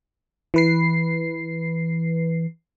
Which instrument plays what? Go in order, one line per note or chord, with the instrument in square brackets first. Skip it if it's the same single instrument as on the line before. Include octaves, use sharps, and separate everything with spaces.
[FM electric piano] E3 B4 C7